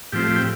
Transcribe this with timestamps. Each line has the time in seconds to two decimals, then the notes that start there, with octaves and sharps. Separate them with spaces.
0.12 A2 F3 C4 G4
0.27 G4
0.36 G5